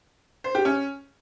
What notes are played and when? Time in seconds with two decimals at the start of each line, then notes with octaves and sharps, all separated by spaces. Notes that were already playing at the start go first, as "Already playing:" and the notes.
0.44 C5
0.55 G4
0.65 C#4